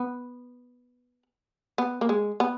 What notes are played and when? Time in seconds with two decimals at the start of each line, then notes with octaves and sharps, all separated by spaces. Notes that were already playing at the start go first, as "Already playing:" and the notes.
Already playing: B3
1.78 B3
2.01 A#3
2.09 G#3
2.40 B3